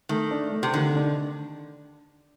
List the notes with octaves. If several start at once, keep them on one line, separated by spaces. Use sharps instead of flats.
D#3 A3
D4
A3
C3
D3 D#3
D4